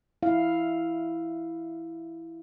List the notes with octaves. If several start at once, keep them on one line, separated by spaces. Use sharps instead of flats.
E4 F5